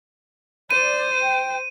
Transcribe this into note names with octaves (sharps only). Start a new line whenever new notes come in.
C5 D5 D#7
G5